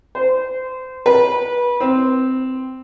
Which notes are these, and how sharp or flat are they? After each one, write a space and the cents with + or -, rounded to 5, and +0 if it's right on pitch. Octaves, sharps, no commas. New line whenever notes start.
C5 -25
B4 -25
C4 -10